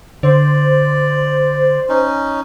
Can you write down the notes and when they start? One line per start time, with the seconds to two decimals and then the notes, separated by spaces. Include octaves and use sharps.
0.23 D3 C5 D5
1.89 C#4 D#4